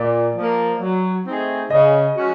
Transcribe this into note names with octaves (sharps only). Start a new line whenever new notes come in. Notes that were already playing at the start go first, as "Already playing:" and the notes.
Already playing: A#2 D5
F3 A#3
F#3
A3 C4 D#4 G#4
C#3 D#5
F3 G#3 C#4 F#4